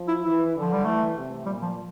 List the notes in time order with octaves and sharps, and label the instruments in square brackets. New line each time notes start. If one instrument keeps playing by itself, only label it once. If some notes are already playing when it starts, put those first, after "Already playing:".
Already playing: [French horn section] F3
[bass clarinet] E4
[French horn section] E3 [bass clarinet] E4
[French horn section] D3
[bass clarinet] F3
G3
[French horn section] E3 [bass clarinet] A3
[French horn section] C3
[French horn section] A#2 [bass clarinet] G3
[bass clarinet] F3